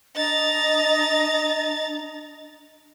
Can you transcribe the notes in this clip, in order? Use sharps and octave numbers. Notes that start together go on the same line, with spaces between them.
D4 D#5 A#5 A6